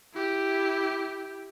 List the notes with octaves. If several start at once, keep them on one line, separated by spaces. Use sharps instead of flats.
E4 G4